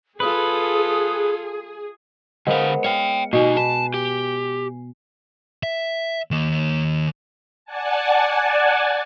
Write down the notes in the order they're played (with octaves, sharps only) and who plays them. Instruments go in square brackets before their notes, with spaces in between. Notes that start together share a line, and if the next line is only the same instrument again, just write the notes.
[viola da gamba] F4 A4 [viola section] G#4 [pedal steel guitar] B4 [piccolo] D#6
[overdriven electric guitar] D3 F5 [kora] G#3 B3 [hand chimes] A#4 C5 F#5
[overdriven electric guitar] C#5 G5 [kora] F5 [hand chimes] C#7
[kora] B2 [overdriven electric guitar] A#3 D#4 [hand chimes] G#5 C7
[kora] B4 [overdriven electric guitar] A5
[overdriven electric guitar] G4
[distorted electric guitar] E5
D#3 A#3
[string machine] D5 F#5 G#5 A5